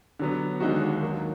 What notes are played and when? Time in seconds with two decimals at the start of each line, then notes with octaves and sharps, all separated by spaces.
0.19 D3 F#3 B3
0.60 D#2 D3 G#3 D#4 F#4
1.02 D#3 F#3 A#3